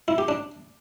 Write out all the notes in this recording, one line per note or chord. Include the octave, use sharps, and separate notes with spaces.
E4
G4
D4